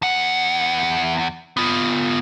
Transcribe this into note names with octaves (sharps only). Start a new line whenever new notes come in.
E2 F#5
B3 F4